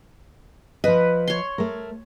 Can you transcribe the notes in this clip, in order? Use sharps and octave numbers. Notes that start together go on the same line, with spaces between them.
F3 B4 D#5
C#5 C6
A3 A#4